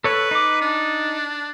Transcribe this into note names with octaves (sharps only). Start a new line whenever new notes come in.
A4 B4 C#5
D#4 D6
D4